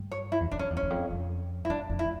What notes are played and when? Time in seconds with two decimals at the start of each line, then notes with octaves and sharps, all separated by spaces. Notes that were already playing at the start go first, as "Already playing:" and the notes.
Already playing: G2
0.12 C#5
0.32 E4
0.40 E2
0.51 F2 D4
0.59 C#4
0.70 E2
0.77 C#4
0.82 E2
0.90 F2
1.10 F2
1.65 E4
1.69 G2 D4
1.90 F2
1.99 E4
2.04 A2